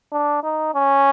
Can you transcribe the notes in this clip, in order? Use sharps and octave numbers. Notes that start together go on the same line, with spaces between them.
D4
D#4
C#4